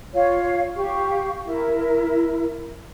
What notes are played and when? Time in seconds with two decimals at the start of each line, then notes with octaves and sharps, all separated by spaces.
0.13 F4 C#5 F5
0.77 G4 F5 C#6
1.46 E4 A#4